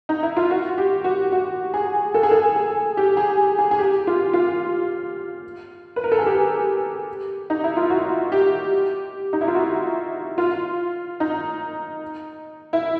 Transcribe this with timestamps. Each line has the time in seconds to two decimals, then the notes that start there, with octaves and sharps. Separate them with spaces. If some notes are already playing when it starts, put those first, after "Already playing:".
0.09 D#4
0.23 E4
0.37 F4
0.51 F#4
0.78 G4
1.04 F#4
1.32 F#4
1.74 G#4
2.14 A4
2.23 G#4
2.31 A4
2.56 G#4
2.97 G4
3.17 G#4
3.59 G#4
3.71 G#4
3.79 G4
4.07 F4
4.33 F4
5.96 B4
6.04 A#4
6.12 A4
6.19 G#4
6.26 G4
7.50 D#4
7.64 E4
7.77 F4
7.90 F#4
8.32 G4
9.33 D#4
9.41 E4
9.48 F4
9.55 F#4
10.38 F4
11.20 D#4
12.73 E4